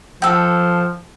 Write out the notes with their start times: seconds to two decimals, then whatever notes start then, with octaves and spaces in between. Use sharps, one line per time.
0.22 F3 A4 G5